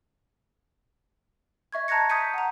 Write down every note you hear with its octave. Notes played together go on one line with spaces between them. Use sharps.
D#5 E5 C#6 G#6
A5 A#5 F#6 G#6 A#6 C#7
D#6 G6 B6 C#7 D#7
F#5 A#5